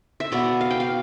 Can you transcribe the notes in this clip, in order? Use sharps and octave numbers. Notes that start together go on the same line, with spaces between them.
E5
B2 B3 D5
F5
G5
F5